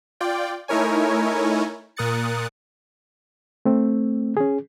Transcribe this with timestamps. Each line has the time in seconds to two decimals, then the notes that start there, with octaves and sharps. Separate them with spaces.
0.20 F4 D5 G5
0.68 A3 D#4 E4 A#4 C#5 G#5
1.96 A#2 A#4 D#6 F#6 A6 C#7
3.65 A3 C4
4.37 C#4 G#4